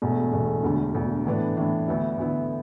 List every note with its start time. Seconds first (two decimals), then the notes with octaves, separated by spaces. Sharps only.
0.02 E1 E2 B2 A3
0.32 E1 E2 B2 A3
0.64 E1 D2 D3
0.94 E1 D2 D3
1.25 A2 E3 B3 D4
1.57 A2 E3 B3 D4
1.88 D2 D3 B3 E4
2.18 D2 D3 B3 E4